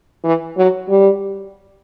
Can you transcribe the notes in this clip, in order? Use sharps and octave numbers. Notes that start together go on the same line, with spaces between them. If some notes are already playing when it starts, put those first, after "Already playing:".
E3
F#3
G3